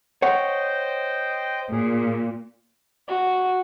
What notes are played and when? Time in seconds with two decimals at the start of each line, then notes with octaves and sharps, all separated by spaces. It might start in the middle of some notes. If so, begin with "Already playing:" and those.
0.22 C5 C#5 D#5 F#5 G5
1.72 A#2 G#4
3.09 F#4